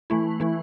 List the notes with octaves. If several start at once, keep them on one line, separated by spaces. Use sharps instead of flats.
E3 A3 E4
E3 A3 E4